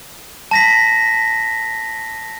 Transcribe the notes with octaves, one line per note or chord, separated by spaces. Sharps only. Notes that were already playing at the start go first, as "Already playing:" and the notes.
A5 A#6 B6